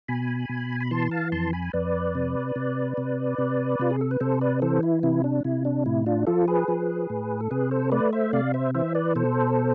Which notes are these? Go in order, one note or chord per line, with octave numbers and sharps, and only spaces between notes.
B2 G#5 B5
B2
B5
E3 A5 C6
F5 A5
F2 A5 C6
G#5 B5
F2 B4 D5
C3
C3
C3
C3
C3 F4
G#4
A4
B4
C3 A4 C5
B4 D5
E3 A4 C5
E4
C3 E4
D4
C3 E4
D4
A2 E4
D4 F4
F3 F4 A4
G#4 B4
F3
A2
A4
C3 G#4 B4
A4 C5
A3 B4 D5
C5 E5
C3 D5 F5
C5 E5
E3 C5 E5
B4 D5
B2 A4 C5